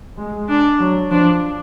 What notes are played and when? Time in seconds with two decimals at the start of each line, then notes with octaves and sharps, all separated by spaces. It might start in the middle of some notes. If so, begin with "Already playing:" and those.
0.17 G#3
0.49 D4
0.80 F#3
1.11 F3 D4